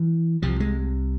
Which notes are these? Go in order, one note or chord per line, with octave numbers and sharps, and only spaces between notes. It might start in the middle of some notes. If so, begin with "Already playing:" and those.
Already playing: E3
C2 C3 F3
G#3